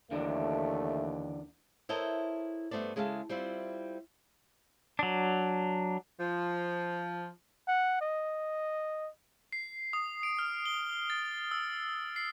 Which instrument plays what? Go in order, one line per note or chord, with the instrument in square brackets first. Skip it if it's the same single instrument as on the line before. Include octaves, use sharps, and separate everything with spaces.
[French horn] D#2 [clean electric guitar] D3 E3 D4 [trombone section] A3
[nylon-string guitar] E4 A4 A#4 C5 C#5 D#5
G2 A3 B3 C5 D5
C#3 G#3 E4 A4 F5
G3 C4 E4 F4
[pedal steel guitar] F#3 D4
[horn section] F3
[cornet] F#5
D#5
[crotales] C7
D#6
D7
F6
G7
A6
E6
C7